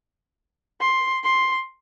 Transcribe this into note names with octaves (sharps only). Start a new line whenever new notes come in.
C6
C6